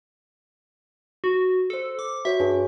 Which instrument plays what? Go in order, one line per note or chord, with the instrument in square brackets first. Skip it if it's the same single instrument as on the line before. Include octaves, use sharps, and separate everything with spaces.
[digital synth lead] F#4
[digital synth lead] A4 [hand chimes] C5 E6
[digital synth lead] D6
[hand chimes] F#4 B4 C#5 [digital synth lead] E5
[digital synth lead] G2 [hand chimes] G#4 C#5 G#5